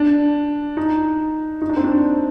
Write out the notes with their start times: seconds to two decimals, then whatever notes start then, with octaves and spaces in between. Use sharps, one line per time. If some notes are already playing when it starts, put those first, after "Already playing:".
Already playing: D4
0.77 D#4
1.62 D#4
1.69 D4
1.76 C4
1.84 D4